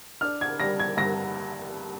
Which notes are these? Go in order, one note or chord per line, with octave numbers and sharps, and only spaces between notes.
D4 F6
G#6
G3 A#6
G#6
G2 A#6